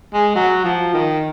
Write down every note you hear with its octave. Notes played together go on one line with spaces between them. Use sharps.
G#3
F#3
F3
D#3